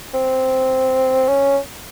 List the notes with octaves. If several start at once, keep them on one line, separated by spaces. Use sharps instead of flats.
C4
C#4